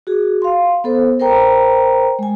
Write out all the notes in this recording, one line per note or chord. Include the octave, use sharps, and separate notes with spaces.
F#4 G#4
F5 C6
B3 A4 C5
A#4 C5 G5 A#5
G#3 G#5